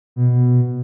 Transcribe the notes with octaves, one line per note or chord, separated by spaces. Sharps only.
B2